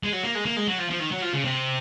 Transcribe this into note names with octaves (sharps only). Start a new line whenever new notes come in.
G#3
F#3
A#3
G#3
A#3
G#3
F#3
F3
F3
D#3
F#3
F3
C#3
C3